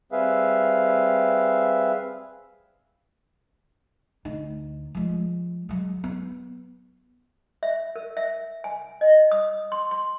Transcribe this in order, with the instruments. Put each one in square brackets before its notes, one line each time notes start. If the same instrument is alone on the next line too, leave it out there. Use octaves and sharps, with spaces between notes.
[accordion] G3 C4 G#4 B4 E5 F5
[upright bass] D2 D#4
F3 G#3
F#3 G#3
B3
[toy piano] E5
A#4
E5
G#5
D#5
D#6
C6
C6